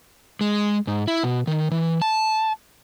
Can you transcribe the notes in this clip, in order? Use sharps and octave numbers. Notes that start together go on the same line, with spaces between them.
G#3
G#2
E4
B2
D#3
E3
A5